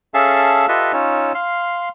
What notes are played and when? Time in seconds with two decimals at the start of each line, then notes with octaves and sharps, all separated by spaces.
0.14 C#4 G#4 A4 E5 F5 A5
0.68 F4 G4 A4 B4 D#5 E5
0.93 C#4 D#4 F4 C#5 E6
1.35 F5 C6 F6